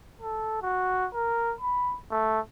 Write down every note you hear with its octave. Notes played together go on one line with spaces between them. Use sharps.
A4
F#4
A#4
B5
A3